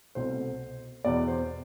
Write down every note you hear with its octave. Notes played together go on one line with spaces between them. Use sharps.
C2 B2 A3 C5
E2 B2 B3 D5
C5